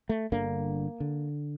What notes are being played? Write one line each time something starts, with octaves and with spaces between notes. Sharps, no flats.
A3
G1 G2 D3 A#3
D3